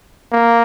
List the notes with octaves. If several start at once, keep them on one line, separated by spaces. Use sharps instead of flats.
A#3